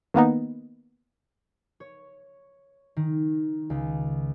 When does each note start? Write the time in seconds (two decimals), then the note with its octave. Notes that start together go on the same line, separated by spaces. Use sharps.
0.14 D#3 A#3 B3 D#4
1.80 C#5
2.96 D#3
3.70 C#2